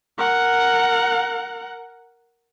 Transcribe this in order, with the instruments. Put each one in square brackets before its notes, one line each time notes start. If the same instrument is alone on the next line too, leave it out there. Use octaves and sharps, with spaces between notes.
[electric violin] A#4 F#5